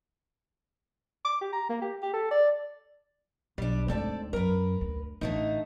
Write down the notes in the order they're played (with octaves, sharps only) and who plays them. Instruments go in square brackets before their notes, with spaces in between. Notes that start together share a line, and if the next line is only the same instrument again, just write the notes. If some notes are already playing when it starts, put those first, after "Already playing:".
[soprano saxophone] D6
G4
A#5
A#3
G4
G4
A4
D5
[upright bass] B1 [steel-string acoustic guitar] G3 D4
[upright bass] D2 G#2 [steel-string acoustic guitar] C4 A4 D5
[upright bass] F#2 [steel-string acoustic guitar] A#4 B4
[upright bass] D2
[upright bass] A1 [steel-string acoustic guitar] D3 A3 D#4